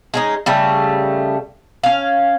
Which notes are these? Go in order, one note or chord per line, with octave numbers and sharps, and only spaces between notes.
G#3 C#4 D#4
C#3 G3 A3
C#4 F5